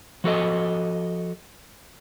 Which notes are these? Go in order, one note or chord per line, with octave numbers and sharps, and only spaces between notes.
F3 F#4 A4 D#5